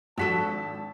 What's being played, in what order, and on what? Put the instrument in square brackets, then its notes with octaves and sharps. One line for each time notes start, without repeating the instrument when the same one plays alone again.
[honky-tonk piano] G#1 B6 E7 [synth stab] F3 [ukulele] D4 F#4 A4 [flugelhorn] A5